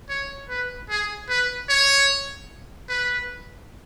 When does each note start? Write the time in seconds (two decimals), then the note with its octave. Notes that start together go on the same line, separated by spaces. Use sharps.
0.09 C#5
0.49 B4
0.90 G#4
1.29 B4
1.69 C#5
2.89 B4